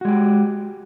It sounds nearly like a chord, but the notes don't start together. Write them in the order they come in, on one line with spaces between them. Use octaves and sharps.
F#4 G#3 G4